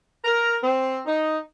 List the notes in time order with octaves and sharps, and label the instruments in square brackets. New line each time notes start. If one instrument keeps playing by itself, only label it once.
[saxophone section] A#4
C4
D#4